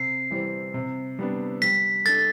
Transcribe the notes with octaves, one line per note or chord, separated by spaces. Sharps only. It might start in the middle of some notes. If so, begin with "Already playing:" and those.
Already playing: C3 C7
E3 G3 C4
C3
G3 B3 D4
G3 B6
D4 A4 A6